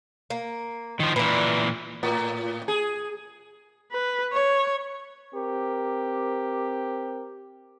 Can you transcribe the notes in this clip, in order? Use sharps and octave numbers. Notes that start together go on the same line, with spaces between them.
A#3
D#3 F3
A#2 E3 B4 D5
A2
G#4
B4
C#5
C4 G4 A#4